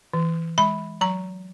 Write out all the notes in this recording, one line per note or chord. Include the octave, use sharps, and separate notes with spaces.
E3
G#3 B5
F#3 A#5